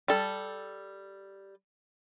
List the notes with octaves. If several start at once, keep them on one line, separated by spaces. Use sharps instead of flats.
G3 A4